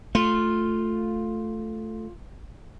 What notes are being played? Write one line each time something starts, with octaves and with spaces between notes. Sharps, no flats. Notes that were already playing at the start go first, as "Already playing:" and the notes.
A3 F4